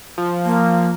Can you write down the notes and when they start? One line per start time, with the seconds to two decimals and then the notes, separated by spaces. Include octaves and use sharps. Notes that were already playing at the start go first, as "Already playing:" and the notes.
0.18 F3
0.45 A#3